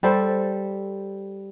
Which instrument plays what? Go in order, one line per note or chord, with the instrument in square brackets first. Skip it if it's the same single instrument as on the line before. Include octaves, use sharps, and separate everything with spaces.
[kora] G3 A4 C5